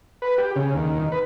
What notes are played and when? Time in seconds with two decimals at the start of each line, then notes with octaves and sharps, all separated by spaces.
0.22 B4
0.38 G4
0.56 C#3
0.74 D#2
1.00 D#3
1.12 B4